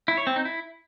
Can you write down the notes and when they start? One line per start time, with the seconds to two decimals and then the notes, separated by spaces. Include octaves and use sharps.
0.08 E4
0.17 C#5
0.27 C4
0.36 D#4
0.45 E4